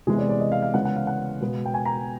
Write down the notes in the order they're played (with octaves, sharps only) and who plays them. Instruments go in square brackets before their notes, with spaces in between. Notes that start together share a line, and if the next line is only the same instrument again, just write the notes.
[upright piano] C3 E3 G#3 B3 G#4
D5
D5
D#5
F5
F5
C#3 E3 G#3 B3 F#5
F#5
F5
F#5
B2 G#3 B3
G5
G#5
A#5